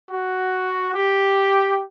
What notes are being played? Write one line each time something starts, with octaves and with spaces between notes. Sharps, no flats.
F#4
G4